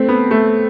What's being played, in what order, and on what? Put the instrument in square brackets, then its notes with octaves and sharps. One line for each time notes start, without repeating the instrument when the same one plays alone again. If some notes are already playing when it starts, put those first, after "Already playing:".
Already playing: [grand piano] A3 C4
B3
A3